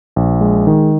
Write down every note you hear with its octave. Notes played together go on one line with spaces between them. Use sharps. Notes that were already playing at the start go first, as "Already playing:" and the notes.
A#1
G#3
D#3